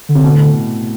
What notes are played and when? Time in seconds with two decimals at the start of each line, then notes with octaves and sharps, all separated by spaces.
0.09 D3
0.15 C3
0.24 B2
0.34 A2